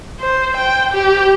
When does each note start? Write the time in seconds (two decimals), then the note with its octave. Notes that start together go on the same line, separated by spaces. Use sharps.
0.20 C5
0.57 G5
0.93 G4